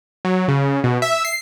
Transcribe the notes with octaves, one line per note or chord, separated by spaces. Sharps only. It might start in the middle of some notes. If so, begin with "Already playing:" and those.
F#3
C#3
B2
E5
C7